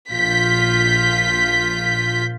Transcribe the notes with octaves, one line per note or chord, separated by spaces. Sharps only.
A#1 F4 G6 B6